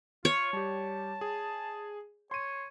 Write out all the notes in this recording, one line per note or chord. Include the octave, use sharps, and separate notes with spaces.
F4 C#5
G3 G4 A5
G#4
C#5 C6 D#7